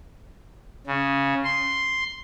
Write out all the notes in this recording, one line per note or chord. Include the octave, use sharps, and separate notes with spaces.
C#3
C6